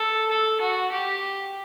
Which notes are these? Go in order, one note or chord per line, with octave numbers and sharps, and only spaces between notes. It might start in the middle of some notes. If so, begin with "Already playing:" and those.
Already playing: A4
A4
F#4
G4